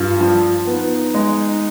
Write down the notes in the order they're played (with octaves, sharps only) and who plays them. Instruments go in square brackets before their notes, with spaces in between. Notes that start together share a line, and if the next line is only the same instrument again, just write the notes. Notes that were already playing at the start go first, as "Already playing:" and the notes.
Already playing: [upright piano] G2 [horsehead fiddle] F4
[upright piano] F3
[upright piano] B3 [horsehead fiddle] D#4
[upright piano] G#3